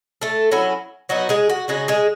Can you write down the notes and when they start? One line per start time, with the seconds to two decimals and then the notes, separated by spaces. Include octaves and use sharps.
0.22 A3 A4
0.52 F#3 C#4 E4
1.09 F#3 B3 D#4 F#4
1.29 G#3 G#4
1.49 F#4
1.68 C#3 G#3 D#4 F#4
1.88 G#3 G#4